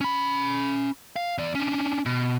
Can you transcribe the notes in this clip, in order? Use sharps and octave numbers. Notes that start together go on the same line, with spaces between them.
C#4 B5
F5
E2 D5
C#4 D4
B2